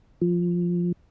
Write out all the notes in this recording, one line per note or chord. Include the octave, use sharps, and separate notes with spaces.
F3